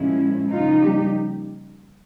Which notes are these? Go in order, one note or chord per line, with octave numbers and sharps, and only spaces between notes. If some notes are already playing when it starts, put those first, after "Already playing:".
Already playing: A#2 F3 G#3 C#4 E4
C#3 F3 A#3 D#4 F4
G3 G4